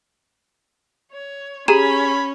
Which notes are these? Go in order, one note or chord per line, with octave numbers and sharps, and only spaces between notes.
C#5
C#4 G4 G#4 A#5 B5 E7